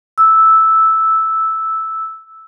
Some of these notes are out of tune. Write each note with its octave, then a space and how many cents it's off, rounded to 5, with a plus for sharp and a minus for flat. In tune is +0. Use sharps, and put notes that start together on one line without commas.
E6 -5